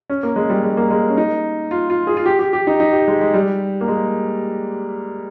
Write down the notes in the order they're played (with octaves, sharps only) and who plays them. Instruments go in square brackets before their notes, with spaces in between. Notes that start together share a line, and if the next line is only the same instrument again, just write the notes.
[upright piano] C#4
A#3
G#3
G3
G#3
A#3
G#3
C#4
D#4
F4
F4
G#4
F4
G4
G4
G4
D#4
D#4
G4
G#3
G#3
G3
A#3
G#3